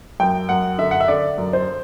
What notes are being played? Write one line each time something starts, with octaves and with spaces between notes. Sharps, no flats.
F#2 G5
F#2 F#5
D3 E5
F#5
E5
D3 D5
F#2
C5